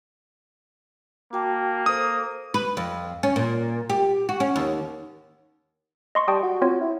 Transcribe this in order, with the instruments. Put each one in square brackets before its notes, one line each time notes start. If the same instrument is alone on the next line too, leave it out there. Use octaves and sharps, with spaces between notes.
[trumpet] A#3 [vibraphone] F#4 G5 A5
[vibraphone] A4 C5 [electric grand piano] D#6
[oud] B4
F2
C#4
A#2
G4
F#4
C#4
D#2
[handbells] D#5 C6 C#6
[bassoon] G3 [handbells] G5 A5 D#6
[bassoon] F#4
[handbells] C4 F4 C#5
[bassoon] E4